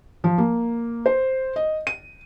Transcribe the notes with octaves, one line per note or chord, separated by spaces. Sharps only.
F3
A#3
C5
D#5
D#7